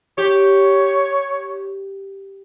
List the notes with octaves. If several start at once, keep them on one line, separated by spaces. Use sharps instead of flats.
G4 C#5